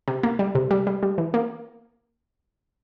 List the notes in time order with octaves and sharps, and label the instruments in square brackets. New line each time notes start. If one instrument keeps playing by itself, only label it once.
[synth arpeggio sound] C3
A#3
G3
C3
G3
G3
G3
E3
A#3